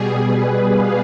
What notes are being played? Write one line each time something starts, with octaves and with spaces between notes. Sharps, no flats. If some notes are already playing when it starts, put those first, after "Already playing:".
Already playing: B2 G3 G#4
B4
F5